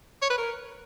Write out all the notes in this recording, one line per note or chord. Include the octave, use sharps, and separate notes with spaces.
C#5
B4
A#4